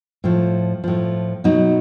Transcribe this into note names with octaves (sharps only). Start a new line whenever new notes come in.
A2 F3
A2 F3
B2 F#3 D#4